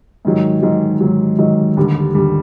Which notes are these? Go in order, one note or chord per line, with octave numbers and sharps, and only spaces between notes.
G#2 D#3 F#3
G#2 D#3 F#3
G#2 D#3 F#3
G#2 D#3 F#3
D#2 D3 G3
D#2 D3 G3